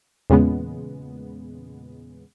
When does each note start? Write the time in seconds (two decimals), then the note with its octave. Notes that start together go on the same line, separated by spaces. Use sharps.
0.30 E2 A#2 C#3 G#3 B3